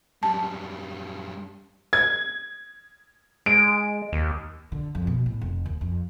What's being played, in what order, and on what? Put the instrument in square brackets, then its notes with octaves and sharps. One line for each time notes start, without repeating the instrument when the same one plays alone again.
[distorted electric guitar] F#2 G3 [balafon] A5
[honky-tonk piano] G#6
[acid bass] G#3 [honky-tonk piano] D7
[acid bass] D#2
[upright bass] D3
F2
B2
A2
F1
D#2
F2